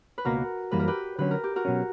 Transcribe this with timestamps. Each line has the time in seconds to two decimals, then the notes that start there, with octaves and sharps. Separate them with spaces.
0.18 B4
0.25 C#2 B2 A#3 F#4 A#4
0.71 F#2 E3 G3 A#3 B4
0.80 A#4
0.87 G4 B4
1.18 D3 F#3 C#4 B4
1.31 A#4
1.44 G4
1.56 F#4 A#4
1.65 B2 F#3 C#4